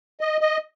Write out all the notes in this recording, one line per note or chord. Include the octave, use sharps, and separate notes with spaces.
D#5
D#5